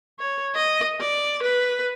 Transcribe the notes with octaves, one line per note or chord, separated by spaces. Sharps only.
C#5
D#5
D5
B4